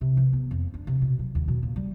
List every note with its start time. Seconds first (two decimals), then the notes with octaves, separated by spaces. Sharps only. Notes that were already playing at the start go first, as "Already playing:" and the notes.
0.01 C3
0.17 E3
0.33 B3
0.51 F2
0.74 D4
0.87 C3
1.02 B2
1.19 F#3
1.35 D#2
1.48 B2
1.63 A#2
1.76 G3